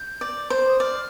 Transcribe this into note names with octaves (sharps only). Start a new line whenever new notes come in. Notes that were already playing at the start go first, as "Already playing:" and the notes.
Already playing: G6
D5
C5
D#6
D5 F6